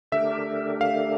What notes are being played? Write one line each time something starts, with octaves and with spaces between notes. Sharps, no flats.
D3 A3 D4 G4 A#4 E5
F5